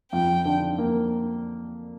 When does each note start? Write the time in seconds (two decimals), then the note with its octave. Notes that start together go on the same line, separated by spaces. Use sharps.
0.12 F2 G5
0.45 D3
0.78 A#3